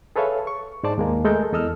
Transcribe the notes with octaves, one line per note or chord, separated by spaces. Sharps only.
G#4 A4 B4 C#5 E5 F5
C#6
G#2 G#3 C5 D5 A5
D#2 G#3 A#3
G#3 A3 A4 A#4 G6
E2 A4 D#5 E6 F6